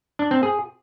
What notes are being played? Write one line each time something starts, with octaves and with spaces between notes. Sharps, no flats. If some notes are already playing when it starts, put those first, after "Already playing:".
D4
C4
G#4